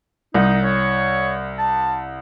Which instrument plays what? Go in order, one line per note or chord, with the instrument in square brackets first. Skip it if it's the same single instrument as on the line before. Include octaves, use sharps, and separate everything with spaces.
[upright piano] C2 [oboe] D#4
[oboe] C#5
A5